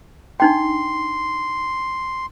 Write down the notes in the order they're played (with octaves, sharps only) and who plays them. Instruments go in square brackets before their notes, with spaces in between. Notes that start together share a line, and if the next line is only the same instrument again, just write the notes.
[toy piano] D4 D#4 G5 [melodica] C6